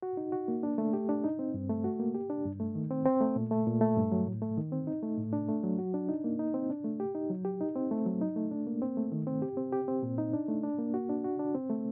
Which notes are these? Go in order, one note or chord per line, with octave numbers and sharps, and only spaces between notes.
F#4
D#4
F#4
A#3
D4
A3
G4
D4
D#4
C4
G2
A3
F#4
A#3
G4
D4
G2
A3
D#3
C4
C4
A3
A#2
A3
A#2
A3
G2
F#3
A2
A3
D#3
C4
D#4
A3
A2
D4
A3
F#3
F#4
D4
D#4
A#3
D#4
C4
D4
A3
G4
D#4
F#3
G4
D#4
C4
A3
F#3
D#4
A3
D4
A#3
C4
A3
D#3
C4
G4
C4
G4
C4
A#2
D#4
D4
A3
D4
A#3
F#4
D4
F#4
D4
C4
A3